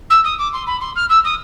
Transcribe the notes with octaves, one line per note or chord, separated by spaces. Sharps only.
E6
D#6
D6
C6
B5
C6
F6
E6
D#6